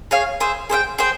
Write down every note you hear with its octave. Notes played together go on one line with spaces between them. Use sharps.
G#4 C#5 F5
G#4 C5 E5
G#4 C5 E5 G5
G#4 C5 G5